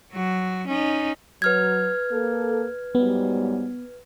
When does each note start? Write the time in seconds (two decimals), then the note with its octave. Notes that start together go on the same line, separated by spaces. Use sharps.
0.13 F#3 F#4
0.67 C#4 D#4
1.42 F#3 B4 F6 G#6
2.11 A#3 A4
2.95 G#2 F#3 G3 B3